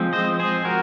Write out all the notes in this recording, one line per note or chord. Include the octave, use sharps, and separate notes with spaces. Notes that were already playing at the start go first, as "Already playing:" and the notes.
Already playing: F3 G#3 C4
C5 D#5
G#4 C5
F#4 A#4